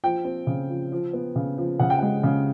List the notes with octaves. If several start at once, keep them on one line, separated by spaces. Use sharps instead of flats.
F3 G5
C4
C#3
F3
F3
B3
C#3
F3
C#3 F#5
G5
G#3 F#5
C#3